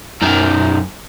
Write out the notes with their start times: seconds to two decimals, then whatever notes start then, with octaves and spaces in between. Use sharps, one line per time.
0.22 F#2 D#3